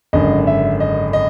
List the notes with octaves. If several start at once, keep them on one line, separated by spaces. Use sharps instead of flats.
G#1 F#2 D3 D#5
E5
D#5
D#5